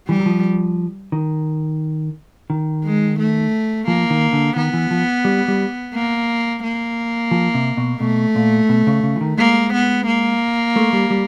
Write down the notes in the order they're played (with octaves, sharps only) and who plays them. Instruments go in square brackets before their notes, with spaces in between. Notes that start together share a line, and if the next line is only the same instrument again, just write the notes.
[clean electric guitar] E3 [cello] G3
[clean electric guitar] F#3
F3
D#3
D#3
[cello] G#3
A3
[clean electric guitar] F3 [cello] A#3
[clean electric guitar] D#3
D3
[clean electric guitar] D#3 [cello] B3
[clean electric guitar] E3
F3
G3
G3
[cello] A#3
A#3
[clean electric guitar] F3
C3
B2
[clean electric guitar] B2 [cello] A3
[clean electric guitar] A#2
B2
C#3
C#3
E3
D#3
[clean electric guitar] G#3 [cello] A#3
[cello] B3
A#3
[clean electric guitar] A3
G3
G3